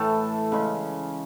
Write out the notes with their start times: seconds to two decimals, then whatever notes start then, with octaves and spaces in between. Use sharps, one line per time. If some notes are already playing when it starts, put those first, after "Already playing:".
Already playing: A2 E3 A3 A5
0.52 C#3 G#3 C#4